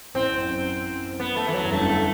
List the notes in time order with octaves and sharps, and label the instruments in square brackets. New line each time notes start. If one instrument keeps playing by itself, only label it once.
[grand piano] A1 A2 [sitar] C4
[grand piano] F#2
F#2
[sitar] B3
A3
E3
[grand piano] E2 [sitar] F#3
[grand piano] F#2
[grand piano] G1 G2 [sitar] A3
[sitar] A3